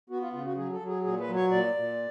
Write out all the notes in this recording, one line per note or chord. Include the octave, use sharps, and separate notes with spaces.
B3 F#4
F4
C#3 F4
F#4
F#3 G#4
A4
F#3
G#4
A#2 G#4
B4
F#3
C#5
A#2 D5
A#2